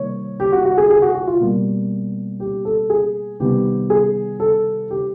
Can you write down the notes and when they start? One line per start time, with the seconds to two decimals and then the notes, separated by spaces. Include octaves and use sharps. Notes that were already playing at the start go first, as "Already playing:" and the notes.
Already playing: C3 D#3 G3 A#3 C#5
0.40 G4
0.52 F#4
0.65 F#4
0.78 G#4
0.90 G#4
1.02 F#4
1.15 F#4
1.27 F4
1.40 B2 G3 A#3
2.40 G4
2.65 A4
2.90 G#4
3.40 C3 D#3 G3 B3 G4
3.90 G#4
4.40 A4
4.90 G4